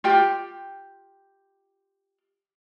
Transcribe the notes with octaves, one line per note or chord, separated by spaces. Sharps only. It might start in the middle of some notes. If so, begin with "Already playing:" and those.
F4 G4 G5